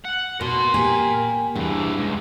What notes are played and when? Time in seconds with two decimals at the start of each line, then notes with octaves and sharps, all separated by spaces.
0.05 F#5
0.41 B2 A#4 C6
0.74 A#3 G4 G#5
1.56 E2 G2 E3
1.98 C#2